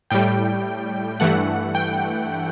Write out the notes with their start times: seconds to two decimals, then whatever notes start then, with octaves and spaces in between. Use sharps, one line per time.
0.10 A2 G3 G5
1.20 G2 E3 A3 F#5
1.75 G5